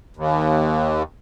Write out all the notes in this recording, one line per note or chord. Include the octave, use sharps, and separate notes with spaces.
D#2